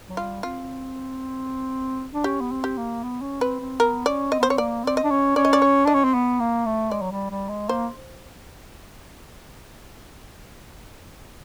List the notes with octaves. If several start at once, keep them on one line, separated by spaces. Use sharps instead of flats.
F#3
G3 F4
C4 F4
D4
C#4 G4
B3
C4
G4
A#3
B3
C#4
C4 B4
C4
B3 A#4
C#4 D5
C4 D#5
B3
C5
C4 C#5
A#3 D5
C4 D5
D#5
D4
C#4
C#4 D5
D#5
D5
C#5
D4 D#5
C#4
C4
B3
A#3
A3
G#3 D5
F#3
G3
G3
G#3
A#3 C5